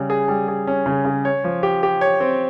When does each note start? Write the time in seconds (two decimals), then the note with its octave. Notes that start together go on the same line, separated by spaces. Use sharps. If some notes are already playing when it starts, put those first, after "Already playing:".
Already playing: C#3 G3
0.10 G#4
0.28 G3
0.48 G#4
0.67 C#4
0.86 C#3
1.05 C#3
1.25 C#5
1.44 F3
1.63 G4
1.83 G4
2.01 C#5
2.20 C4